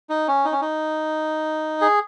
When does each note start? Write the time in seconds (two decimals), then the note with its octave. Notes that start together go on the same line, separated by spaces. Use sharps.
0.09 D#4
0.28 C#4
0.45 D#4
0.52 C#4
0.61 D#4
1.81 G#4